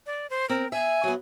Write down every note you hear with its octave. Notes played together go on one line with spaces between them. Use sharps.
D5
C5
C4 A#4
E5 G#5
F#3 B3